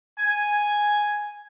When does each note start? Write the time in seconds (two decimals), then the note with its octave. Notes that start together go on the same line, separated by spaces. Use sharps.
0.19 G#5